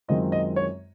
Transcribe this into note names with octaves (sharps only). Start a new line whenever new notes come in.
F#2 D#3 G#3 C4 F4 D#5
D#5
C#5